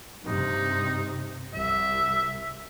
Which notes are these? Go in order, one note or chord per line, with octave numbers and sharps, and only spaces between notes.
G2 C3 D#4
C2 E5